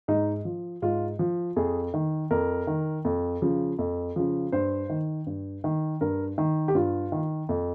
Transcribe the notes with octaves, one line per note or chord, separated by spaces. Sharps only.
G#2 D#4
F3
G#2 F4
F3
F2 G#4
D#3
F2 A#4
D#3
F2
C#3 F3
F2
C#3 F3
G2 C5
D#3
G2
D#3
G2 A#4
D#3
G4
G2 F4
D#3
F2